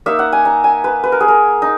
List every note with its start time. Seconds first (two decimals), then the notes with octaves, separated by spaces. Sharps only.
0.06 A#3 D#4 E5
0.19 F#5
0.32 G#5
0.45 A#5
0.64 G#5
0.84 B4
1.03 B4
1.12 A#4
1.20 G#4
1.28 A#4
1.62 D#4